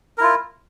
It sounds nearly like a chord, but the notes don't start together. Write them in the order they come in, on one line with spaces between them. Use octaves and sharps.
A#4 E4 F4